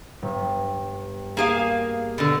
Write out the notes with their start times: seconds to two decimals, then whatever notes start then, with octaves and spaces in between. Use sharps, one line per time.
0.22 G1
1.37 A#3 G#4 F5
2.18 B2 D3